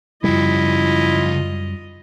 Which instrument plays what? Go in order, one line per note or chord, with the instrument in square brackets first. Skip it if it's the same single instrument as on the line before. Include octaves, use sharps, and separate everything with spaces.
[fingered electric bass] F#2 G3 [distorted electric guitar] C#3 F3 [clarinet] E4 [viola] F4 D#5